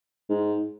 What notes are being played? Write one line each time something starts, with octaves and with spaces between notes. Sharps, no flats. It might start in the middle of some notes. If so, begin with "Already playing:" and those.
G#2